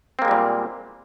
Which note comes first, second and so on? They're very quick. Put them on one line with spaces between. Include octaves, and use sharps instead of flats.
C4 A#3 G#3 G3 A#2